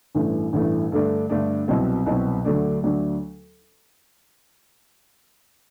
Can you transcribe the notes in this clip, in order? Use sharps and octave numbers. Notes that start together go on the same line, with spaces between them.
A1 G2 E3 A3
A1 G2 E3 A3
G2 D3 A3 D4
G2 D3 A3 D4
C2 B2 F#3 C4
C2 B2 F#3 C4
D2 D3 F#3 A3 D4
D2 D3 F#3 A3 D4